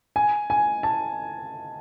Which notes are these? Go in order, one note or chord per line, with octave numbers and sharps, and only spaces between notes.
G#5
G#5
A5